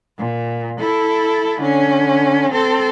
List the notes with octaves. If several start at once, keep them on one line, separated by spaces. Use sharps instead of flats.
A#2
E4 A4
D3 C#4
C4 A4